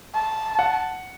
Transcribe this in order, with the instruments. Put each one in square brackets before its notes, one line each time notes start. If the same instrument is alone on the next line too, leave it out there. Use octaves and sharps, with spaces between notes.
[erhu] A5
[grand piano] F#5